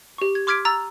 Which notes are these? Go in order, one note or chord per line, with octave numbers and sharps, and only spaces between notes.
G4 C#6
G#6
C6 D6 F6 G#6 B6 D7
A#5 E6 F6 A6 F7